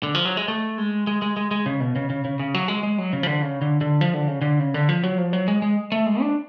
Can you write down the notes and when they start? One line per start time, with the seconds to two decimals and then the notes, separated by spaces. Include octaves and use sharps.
0.03 D3
0.15 F3
0.25 F#3
0.37 G#3
0.48 A3
0.78 G#3
1.07 G#3
1.22 G#3
1.37 G#3
1.51 G#3
1.66 C#3
1.80 B2
1.96 C#3
2.10 C#3
2.25 C#3
2.39 C#3
2.54 F#3
2.68 G#3
2.83 G#3
2.98 F#3
3.13 C#3
3.23 F3
3.27 D3
3.42 C#3
3.62 D3
3.81 D3
4.01 F3
4.14 D3
4.28 C#3
4.42 D3
4.59 C#3
4.74 D3
4.89 F3
5.03 F#3
5.18 F3
5.33 F#3
5.48 G#3
5.62 G#3
5.92 A3
6.06 G#3
6.21 D4